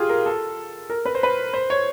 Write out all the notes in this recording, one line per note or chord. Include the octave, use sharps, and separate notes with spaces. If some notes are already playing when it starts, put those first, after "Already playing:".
Already playing: F4 G4 G#4
A#4
A4
A#4
B4
C5
B4
C5
C#5